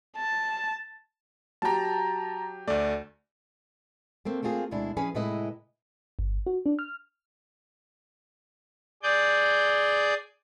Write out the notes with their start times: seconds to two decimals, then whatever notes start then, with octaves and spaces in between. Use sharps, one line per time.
0.16 A5
1.62 F#3 G4 A5 A#5
2.68 D2 A3 D5
4.25 A3 A#3 C4
4.43 A3 A#3 C4 F4 G#4
4.71 D2 B2 G#3 D4 E4
4.97 F3 C#4 G#4 B4 G#5
5.15 A2 C3 G#3 E4 B4 D#5
6.19 G1
6.47 F#4
6.66 D4
6.79 F6
9.03 G#4 D5 G6